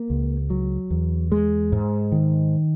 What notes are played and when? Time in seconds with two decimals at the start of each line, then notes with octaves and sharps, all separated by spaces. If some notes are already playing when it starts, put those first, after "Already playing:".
Already playing: A#3
0.10 C#2
0.50 F#3
0.90 E2
1.32 G#3
1.72 G#2
2.12 D#3